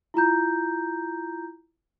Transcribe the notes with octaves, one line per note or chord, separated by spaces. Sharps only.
E4 F4 A#5 G6